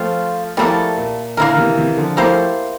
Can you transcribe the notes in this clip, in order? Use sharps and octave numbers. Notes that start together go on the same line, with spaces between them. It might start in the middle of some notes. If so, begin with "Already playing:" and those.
Already playing: F3 A3 C4 F4
F3 G3 A3 A#3 E4 A4
A#2
A#2 D3 A#3 E4 A#4
C3 E3
C3 E3
D3 F3
F3 A3 A#3 E4 G4 C5